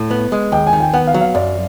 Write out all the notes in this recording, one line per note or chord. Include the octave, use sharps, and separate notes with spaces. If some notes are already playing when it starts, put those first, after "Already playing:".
Already playing: A2
B3
G#3
D#2 G5
G#5
D#3
G5
B3 F#5
F5
F#3
F5
F#2 D5